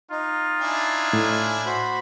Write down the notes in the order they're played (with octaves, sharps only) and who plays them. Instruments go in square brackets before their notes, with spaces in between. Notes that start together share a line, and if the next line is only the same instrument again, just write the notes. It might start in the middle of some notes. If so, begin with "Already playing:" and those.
[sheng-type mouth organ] D#4 [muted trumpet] F4
[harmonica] D4 E4 G#5
[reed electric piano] A2
[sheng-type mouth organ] F#4 C5 B5